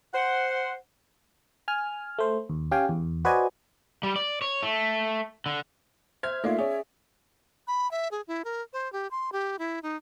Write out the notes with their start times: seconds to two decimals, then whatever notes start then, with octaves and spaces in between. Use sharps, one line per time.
0.13 C5 F#5
1.68 G#5 F6
2.19 A3 C5
2.49 D#2
2.71 C#4 G4 F5 G5 G#5
2.89 E2
3.25 F#4 B4 C5 D5 D#5 G#5
4.03 G3
4.16 D5
4.42 C#5
4.63 A3
5.46 D3
6.23 C5 E5 F6 G#6
6.44 A3 A#3 D#4 F4 D5 E5 F5
6.59 C#4 G#4 C#5 D5
7.67 B5
7.91 E5
8.11 G#4
8.28 E4
8.45 A#4
8.73 C5
8.93 G4
9.11 C6
9.32 G4
9.59 E4
9.83 D#4